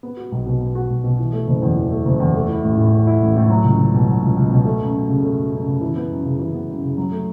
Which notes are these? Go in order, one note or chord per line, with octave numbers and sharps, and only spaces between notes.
B3
F#4
B1
B2
B3
F#4
B1
B2
E3
A3
F#1
E2
E3
A3
F#1
E2
A3
E4
A1
A2
A3
E4
A1
A2
F#3
C#2
C#2
B2
F#3
C#2
C#2
B2
A3
F#2
F#2
C#3
A3
F#2
F#2
C#3
E3
B3
F#2
C#3
E3
B3
F#2
C#3
F#3
A3